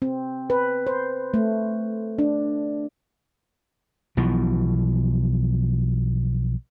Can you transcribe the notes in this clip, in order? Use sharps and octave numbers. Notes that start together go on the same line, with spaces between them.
C4
B4
C5
A3
D4
B1 B2 E3 F3